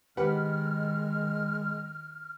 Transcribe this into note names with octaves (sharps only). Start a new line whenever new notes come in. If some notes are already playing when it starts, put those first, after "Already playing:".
D#3 G#3 G4 B4 F#5 F6